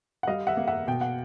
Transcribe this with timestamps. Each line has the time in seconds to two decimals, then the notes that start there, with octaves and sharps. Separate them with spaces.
0.23 F#5
0.27 G3 D#5 F5
0.47 E5 F#5
0.57 A#3
0.68 E5 F#5
0.87 B2 G5
1.01 F#5